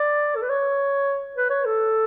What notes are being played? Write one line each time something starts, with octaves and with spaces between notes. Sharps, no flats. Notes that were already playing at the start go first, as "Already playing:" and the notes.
Already playing: D5
A4
B4
C#5
B4
C#5
A4